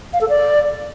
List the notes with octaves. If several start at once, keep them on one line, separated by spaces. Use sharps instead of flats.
F5
A4
D5